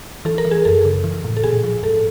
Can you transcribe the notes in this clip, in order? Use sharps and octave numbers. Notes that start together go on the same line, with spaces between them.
E3 A4
A#4
E3
G#4
F#2 A4
C#3
E3
A2
A4
A#2 G#4
F3
G#2 A4